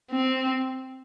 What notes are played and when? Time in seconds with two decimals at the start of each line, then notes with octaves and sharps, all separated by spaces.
0.12 C4